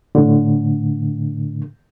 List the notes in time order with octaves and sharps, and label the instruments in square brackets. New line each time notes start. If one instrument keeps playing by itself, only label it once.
[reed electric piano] A2 D3